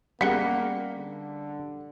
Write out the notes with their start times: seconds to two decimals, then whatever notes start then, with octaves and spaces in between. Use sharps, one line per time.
0.21 G3 A#3 B3 C#4 F#4 G#4
0.95 D3